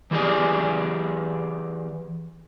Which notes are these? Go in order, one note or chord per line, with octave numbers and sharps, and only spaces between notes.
E3 A3 G4 G#4 D5 G#5